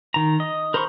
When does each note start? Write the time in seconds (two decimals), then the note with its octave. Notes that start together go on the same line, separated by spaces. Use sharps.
0.14 D#3 A#5
0.40 D#5
0.74 A#4 C5 A#5 B5 C#6